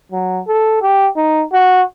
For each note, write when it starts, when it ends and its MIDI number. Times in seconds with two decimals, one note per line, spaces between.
0.12 0.41 54
0.47 0.78 69
0.81 1.07 67
1.16 1.43 63
1.52 1.81 66